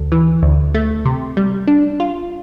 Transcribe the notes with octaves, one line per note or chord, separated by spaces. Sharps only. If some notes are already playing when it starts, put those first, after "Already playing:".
Already playing: D2
E3
D2
A3
C3
G3
D4
F4